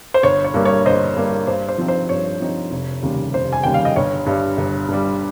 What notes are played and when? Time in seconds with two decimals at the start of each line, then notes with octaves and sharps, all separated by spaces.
0.14 C5
0.23 G1 C#5
0.44 C#5
0.54 G2 G3 A#3
0.65 C#5
0.86 G1 C5 D#5
1.16 G2 G3 A#3
1.47 G2 C5
1.69 C5
1.78 F3 C4 D#4
1.88 C5
2.09 G2 C#5
2.41 F3 C4 D#4
2.71 F1
3.03 D#2 C#3 G3
3.34 F1 C5
3.53 G#5
3.63 D#2 C#3 G3 G5
3.74 F5
3.85 D#5
3.96 G1 C#5
4.26 G2 G3
4.57 G1
4.88 G2 G3